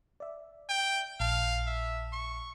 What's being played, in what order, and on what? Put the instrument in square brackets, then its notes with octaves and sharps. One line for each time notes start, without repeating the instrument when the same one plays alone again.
[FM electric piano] D5 E5
[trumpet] G5
[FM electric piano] A#1 A5 [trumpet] F5
[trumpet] E5
C#6